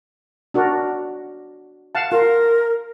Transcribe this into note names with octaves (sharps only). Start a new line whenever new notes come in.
D4 F#4 A#4
F5 F#5 A5
F4 A#4